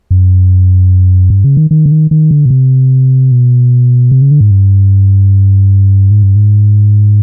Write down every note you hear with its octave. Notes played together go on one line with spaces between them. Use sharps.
F#2
G2
C#3
D#3
D#3
D3
D#3
D#3
D3
B2
C3
B2
C3
C#3
D3
G#2
G2
G#2
G2
G#2